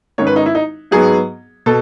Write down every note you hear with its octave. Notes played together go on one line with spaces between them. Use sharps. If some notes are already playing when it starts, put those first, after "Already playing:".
G#2 D#3 G#3 C#4 C#5
B4
D#4
E4
D#4
G#2 F#3 B3 G#4
B2 A4